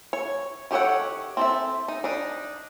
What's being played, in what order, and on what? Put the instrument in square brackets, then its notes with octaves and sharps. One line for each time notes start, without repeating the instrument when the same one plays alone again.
[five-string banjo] C#5
D#3 G4 A4 C#5 F#5
C4 A4 E5
D#4
D4 D#4